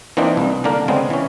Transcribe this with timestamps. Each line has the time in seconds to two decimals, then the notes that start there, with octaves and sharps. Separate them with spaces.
0.17 E3 A#3 C4 D4 D#4
0.37 C2
0.64 D3 A#3 D4 A#4
0.88 C#3 G#3 B3 C4
1.10 E3 C#4